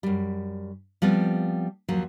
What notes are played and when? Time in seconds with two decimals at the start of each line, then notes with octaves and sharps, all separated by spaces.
0.03 F#2 G3
1.02 F3 G3 B3 C4
1.89 D#2 F3 F#3